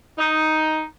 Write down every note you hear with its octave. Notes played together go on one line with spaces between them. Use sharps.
D#4